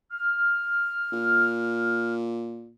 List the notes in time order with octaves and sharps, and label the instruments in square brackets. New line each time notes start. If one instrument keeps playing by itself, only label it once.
[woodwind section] F6
[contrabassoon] A#2